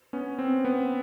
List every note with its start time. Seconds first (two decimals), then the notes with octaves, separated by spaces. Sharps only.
0.13 B3 C#4
0.39 C4
0.65 B3